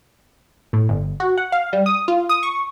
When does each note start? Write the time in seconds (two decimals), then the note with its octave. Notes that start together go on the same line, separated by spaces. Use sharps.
0.73 A2
0.89 G1
1.20 F#4
1.37 F#5
1.52 F5
1.73 G3
1.86 D#6
2.08 F4
2.29 D#6
2.43 C#6